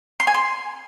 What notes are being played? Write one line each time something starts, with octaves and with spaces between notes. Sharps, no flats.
C6
G#5
C6